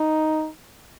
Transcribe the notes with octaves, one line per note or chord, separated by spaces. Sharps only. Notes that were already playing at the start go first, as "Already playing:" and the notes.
Already playing: D#4